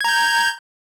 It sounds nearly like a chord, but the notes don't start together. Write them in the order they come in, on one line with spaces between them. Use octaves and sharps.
G#6 A#5 G6